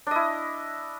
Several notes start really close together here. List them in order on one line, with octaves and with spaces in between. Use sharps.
D4 D#5 E4